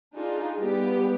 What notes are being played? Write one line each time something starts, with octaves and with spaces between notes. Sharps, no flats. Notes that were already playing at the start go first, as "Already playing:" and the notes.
D4 D#4 F4 G#4
G3 B3 G4